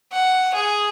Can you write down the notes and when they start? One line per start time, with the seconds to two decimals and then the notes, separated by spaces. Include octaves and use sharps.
0.12 F#5
0.55 G#4